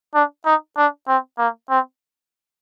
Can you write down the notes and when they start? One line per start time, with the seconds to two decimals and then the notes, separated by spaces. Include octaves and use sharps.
0.15 D4
0.46 D#4
0.77 D4
1.08 C4
1.38 A#3
1.70 C4